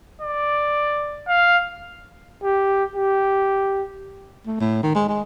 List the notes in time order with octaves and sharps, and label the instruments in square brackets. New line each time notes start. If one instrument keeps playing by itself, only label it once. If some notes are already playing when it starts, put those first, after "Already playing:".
[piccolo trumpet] D5
F5
[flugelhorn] G4
G4
[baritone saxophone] A3
A2
D#3
G#3
G#3